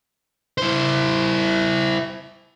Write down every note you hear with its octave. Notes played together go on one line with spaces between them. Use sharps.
E4 C5